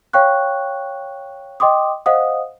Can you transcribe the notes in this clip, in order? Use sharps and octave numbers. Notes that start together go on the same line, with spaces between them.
C#5 F5 G5 C#6 F#6
D#5 G5 C6 D6 D#6
C5 D#5 F5 F#5 D#6